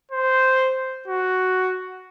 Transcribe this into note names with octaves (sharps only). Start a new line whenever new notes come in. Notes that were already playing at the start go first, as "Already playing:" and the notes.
C5
F#4